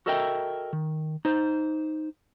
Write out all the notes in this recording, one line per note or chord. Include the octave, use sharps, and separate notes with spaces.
F#4 A4 A#4 D#5 E5 G5
D#3
D#4 C5